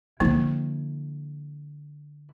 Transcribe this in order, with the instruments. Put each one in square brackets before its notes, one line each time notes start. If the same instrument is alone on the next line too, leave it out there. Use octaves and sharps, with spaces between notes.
[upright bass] D3 E4 [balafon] F3 A#3